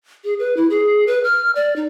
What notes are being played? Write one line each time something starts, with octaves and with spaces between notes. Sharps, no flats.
G#4
B4
E4
G#4
B4
F6
D5
D#4